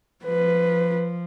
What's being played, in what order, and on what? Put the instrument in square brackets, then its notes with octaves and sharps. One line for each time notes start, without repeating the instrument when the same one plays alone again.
[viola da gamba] F3 [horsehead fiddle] B4